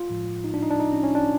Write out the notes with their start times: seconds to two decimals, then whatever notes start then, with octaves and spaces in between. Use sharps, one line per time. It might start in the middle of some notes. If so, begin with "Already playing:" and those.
Already playing: F4
0.10 A2 F3 G#3
0.44 D#4
0.54 D4
0.63 D#4
0.70 D4
0.80 D#4
0.92 C#4
1.03 C#4
1.15 D4